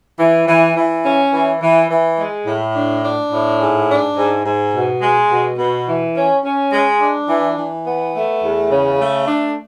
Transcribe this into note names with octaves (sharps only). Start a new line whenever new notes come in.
E3
E3
E3
C#4
E3
E3
E3
G#3
A2
D4
D4
A2
G#2
D4
G#2
G#2
B2
G#3
B2
B2
E3
C#4
C#4
G#3
D4
E3
E3
B3
A3
E2
C#3
A3
D4